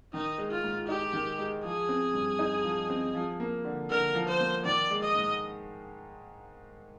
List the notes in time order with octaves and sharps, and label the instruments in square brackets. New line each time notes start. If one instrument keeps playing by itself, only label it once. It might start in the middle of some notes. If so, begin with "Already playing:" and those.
[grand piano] D#3 [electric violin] D#4
[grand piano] G#3
[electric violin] F4
[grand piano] G#2
[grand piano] D#4 [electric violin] G4
[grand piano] D#3
G#3
[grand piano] F3 [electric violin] G#4
[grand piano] C4
G2
D#4
F3
C4
F3
A#3
D3
[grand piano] D3 [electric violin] A#4
[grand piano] F3
[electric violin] C5
[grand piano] A#3
[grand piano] D#3 [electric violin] D5
[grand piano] G#3
[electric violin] D#5
[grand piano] G#2